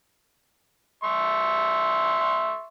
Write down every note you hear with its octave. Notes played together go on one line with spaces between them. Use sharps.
E5 C6 C#6